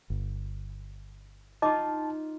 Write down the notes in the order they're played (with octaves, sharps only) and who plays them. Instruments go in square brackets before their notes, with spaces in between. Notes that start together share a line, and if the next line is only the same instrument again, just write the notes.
[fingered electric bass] G1
[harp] D#4 F4 [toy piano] D#5 D6 [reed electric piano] A5